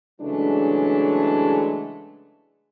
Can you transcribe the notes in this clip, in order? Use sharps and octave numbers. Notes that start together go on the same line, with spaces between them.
C#3 E3 F#3 G#3 A3 D4